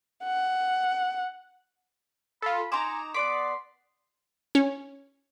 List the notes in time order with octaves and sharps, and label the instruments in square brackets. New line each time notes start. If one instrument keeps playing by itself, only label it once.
[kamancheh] F#5
[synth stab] F4 A4 [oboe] B5
[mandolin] D#4 C6 D6 [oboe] G#5 [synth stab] A#5 E7
[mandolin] B3 D5 D6 [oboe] C6 [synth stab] B6
[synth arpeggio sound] C#4